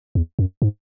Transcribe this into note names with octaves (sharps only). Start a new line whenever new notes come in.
E2
F#2
G#2